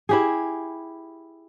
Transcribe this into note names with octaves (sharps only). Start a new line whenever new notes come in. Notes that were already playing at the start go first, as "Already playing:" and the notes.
E4 G4 G#4